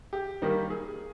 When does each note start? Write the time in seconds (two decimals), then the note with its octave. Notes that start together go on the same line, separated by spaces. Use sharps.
0.13 G4
0.42 D#3 G3 A#3 D#4
0.70 G#4